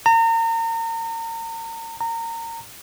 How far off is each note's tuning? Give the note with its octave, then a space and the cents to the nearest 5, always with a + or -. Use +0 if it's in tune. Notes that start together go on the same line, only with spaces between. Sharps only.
A#5 -35
A#5 -25